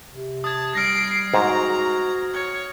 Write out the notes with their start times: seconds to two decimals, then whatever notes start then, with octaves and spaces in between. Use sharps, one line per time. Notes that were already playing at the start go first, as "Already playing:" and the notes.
0.11 C3
0.44 A5 D#6 G#6
0.75 G3 F6 A#6 C7 D7
1.34 G#2 F#4 A#5
2.33 C#5